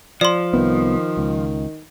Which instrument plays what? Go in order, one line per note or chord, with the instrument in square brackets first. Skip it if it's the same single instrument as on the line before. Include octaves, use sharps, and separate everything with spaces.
[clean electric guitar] F3 [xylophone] D5 C6
[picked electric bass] C2 B3 [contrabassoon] D#3
[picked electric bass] C#2